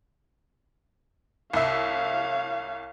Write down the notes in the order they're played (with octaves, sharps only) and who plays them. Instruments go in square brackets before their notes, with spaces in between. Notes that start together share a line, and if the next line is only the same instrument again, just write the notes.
[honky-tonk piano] C2 E5 [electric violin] C#5 F5